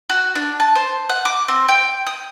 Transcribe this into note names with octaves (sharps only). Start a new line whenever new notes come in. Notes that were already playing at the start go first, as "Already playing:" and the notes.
F#4
D4
A5
C5
F#5
D6
C4
G5
D#6